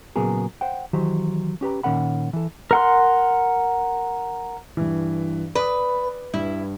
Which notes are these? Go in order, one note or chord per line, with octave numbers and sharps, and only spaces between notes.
A#2 C#3 F#3 B3 G#4 A#4
C5 F#5 G5
D#3 E3 F#3 G4 C5
C#4 G4 B4 A#5
A#2 D#3 C#4 A#4 F#5 B5
E3 A4
A#4 F#5 C6
G2 E3
B4 D5 D#6
G2 E4